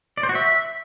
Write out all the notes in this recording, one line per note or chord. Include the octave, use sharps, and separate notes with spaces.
D5
C5
F#4
E5